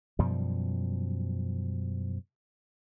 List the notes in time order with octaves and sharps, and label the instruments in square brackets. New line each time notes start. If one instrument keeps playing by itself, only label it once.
[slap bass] F#2 B2 F3 G3